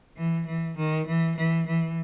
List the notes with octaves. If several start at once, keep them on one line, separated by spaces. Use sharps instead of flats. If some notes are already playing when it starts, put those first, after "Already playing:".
E3
E3
D#3
E3
E3
E3